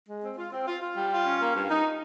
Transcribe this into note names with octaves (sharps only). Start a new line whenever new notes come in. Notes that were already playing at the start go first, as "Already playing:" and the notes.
G#3
C4
F4
C4
F4
F4
G3
F4
C#4
A#3
G2
D#4